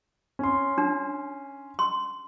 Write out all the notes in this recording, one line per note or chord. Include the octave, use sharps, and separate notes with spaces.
C#4 C6
D4
C6